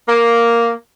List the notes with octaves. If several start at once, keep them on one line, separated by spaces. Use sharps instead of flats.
A#3